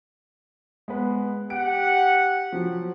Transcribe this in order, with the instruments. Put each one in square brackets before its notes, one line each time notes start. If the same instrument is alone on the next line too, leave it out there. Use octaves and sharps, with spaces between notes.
[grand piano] G#3 B3 B4
[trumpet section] G4 F#5 [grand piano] D7
[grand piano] F3 F#3